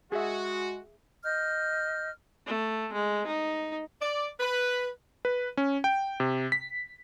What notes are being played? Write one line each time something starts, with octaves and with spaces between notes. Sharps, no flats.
G#3 F#4 G#4 E5
D#5 F6 G6
A3
G#3
D#4
D5
B4
B4
C#4
G5
C3
B6